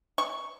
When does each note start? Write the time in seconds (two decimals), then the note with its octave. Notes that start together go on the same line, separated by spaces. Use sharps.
0.18 C#6